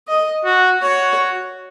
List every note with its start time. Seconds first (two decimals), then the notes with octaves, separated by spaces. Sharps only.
0.08 D#5
0.45 F#4
0.82 F#4 C#5